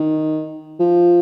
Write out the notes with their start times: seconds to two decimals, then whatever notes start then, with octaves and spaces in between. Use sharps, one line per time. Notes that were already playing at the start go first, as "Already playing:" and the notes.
Already playing: D#3
0.80 F3